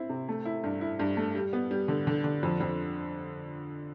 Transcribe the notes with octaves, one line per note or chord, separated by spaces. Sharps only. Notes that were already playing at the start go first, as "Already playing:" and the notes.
Already playing: C4 E4
C3
A3
E4
G2
E4
G2
A3
G3
B3
G3
D3
D3
D3
F2
F2